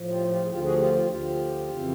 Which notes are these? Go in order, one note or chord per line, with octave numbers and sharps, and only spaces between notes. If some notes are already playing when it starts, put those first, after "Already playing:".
Already playing: A2 F3
F4 G4
F4 G4
G#4
D2 D3 F3 F4 G4
F#4 G#4
F4 G4
F4 G4
D2 D3 F3 F4 G4
F2 C#3 E3